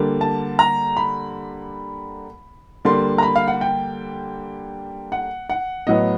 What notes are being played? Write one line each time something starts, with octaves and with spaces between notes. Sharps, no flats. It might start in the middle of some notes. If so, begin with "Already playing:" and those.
Already playing: D3 G3 A#3
A5
A#5
B5
D3 G3 A#3 C6
A#5
B5
F5
F#5
G5
F#5
F#5
A2 F#3 B3 D#5